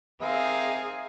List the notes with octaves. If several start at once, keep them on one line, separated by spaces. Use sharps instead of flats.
C4 D#4 G#4 A#4 E5 F5